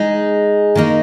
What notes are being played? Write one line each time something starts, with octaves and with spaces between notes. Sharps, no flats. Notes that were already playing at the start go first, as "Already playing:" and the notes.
Already playing: G#3 D#4 G#4
D#3 A#3 D#4